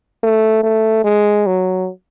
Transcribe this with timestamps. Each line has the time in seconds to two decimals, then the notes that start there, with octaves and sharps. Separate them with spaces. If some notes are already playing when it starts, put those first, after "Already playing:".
0.23 A3
0.63 A3
1.05 G#3
1.46 F#3